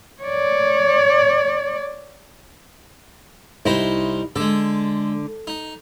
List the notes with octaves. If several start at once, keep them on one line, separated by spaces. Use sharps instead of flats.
C#5 D5
C2 D#4 E4 C5 D#5
D3 G#3 A4
D#4